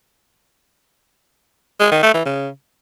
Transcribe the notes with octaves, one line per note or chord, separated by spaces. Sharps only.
G#3
D#3
A3
E3
C#3